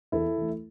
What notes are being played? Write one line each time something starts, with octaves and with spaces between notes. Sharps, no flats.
E2 E4 A4
E3 A3